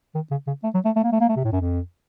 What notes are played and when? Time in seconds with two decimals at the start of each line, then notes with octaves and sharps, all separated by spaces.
0.15 D#3
0.31 C#3
0.47 C#3
0.64 A3
0.74 F#3
0.86 A3
0.96 A3
1.04 A#3
1.12 A3
1.21 A#3
1.29 A3
1.37 C3
1.45 A2
1.53 F#2
1.61 F2